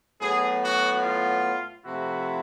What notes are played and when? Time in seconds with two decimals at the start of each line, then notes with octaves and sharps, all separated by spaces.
0.20 A2 F#3 B3 G#4
0.62 F#4
1.02 F4
1.84 C3 F3 A3 C4 E4 F#4